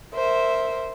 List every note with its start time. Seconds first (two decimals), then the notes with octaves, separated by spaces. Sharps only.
0.14 A#4 C5 E5